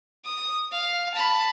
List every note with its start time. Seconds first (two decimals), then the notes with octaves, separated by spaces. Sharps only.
0.25 D#6
0.72 F5
1.14 A5 B5